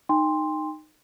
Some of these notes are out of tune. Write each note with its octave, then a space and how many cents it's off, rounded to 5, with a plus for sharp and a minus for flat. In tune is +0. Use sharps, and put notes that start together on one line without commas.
D#4 -15 G5 +35 C6 +0